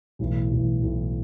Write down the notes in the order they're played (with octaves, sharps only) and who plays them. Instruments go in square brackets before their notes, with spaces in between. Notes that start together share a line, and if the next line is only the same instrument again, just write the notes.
[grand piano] B1 A2 E3
B1 A2 E3
B1 A2 E3